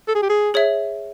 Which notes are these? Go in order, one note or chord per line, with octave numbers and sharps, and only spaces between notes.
A4
G#4
G4
G#4
G#4 C#5 E5